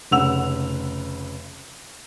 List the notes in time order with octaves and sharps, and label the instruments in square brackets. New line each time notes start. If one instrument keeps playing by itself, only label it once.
[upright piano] F1 C#3 F#5 E6 F7